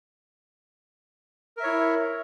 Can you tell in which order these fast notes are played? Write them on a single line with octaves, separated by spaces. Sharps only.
A#4 E5 C#5 E4